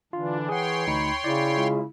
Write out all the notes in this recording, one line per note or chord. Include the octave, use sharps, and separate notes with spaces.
D3 E3 D4 F4
G#4 C#5 F#5 G5 C6
D2 D#4 B5 C#7
C#3 E4 D5
G#3 F4